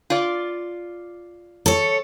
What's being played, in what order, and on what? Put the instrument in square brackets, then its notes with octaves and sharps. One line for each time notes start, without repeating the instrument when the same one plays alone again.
[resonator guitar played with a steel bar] F4 D5
[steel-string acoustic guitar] A4 C#5